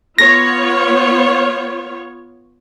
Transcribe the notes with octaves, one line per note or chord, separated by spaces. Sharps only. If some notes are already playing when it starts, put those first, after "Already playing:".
B3 F4 C#5 A#6